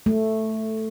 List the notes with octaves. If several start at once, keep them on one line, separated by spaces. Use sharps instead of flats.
A3